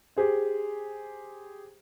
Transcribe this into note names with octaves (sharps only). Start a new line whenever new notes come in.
G4 G#4 C5